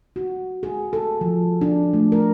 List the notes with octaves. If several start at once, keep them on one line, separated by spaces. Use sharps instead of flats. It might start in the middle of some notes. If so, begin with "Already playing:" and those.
F#4
G#4
A4
F3
D4
A3
A#4